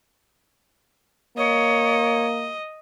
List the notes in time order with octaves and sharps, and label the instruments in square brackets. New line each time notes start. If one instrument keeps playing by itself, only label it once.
[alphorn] A#3 [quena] C#5 [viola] D#5